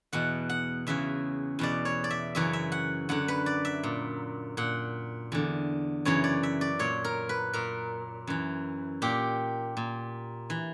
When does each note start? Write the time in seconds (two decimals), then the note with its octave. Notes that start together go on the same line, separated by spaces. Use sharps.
0.13 E2 B2 F#5
0.49 F#5
0.87 E2 C#3 E3 E5
1.59 E2 B2 D5
1.85 C#5
2.04 D5
2.11 E5
2.35 F#2 C#3 E3 E5
2.53 E5
2.72 F#5
3.09 F#2 D3 F#5
3.28 B4
3.46 D5
3.65 E5
3.83 A#2
4.57 A#2 F#5
5.32 E2 D3
6.05 F#2 C#3 E3 C#5
6.24 D5
6.43 E5
6.61 D5
6.79 A#2 C#5
7.04 A#4
7.29 B4
7.53 A#2 A#4
8.27 F#2 E3
9.02 A#2 G4
9.77 A#2
10.50 E3